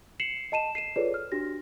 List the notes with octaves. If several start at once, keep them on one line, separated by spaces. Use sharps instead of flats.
C7 C#7 E7 F#7
D#5 A5 D#7 E7
C7 D#7 E7
F4 G#4 A4 B4 C#5 D5
F6
D4 F#4 G4 A#6